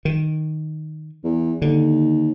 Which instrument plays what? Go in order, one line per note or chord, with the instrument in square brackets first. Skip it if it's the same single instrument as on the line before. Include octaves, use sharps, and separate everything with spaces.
[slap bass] D#3
[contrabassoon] E2
[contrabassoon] D#2 [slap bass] D3